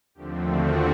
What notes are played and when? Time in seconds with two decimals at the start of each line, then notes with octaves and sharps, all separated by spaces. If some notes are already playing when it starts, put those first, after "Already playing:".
0.15 D#2 D3 F3 A3 C4 G4
0.45 F#4